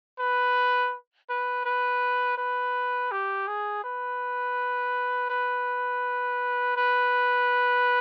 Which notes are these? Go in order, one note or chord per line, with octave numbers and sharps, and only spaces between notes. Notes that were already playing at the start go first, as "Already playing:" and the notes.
B4
B4
B4
B4
G4
G#4
B4
B4
B4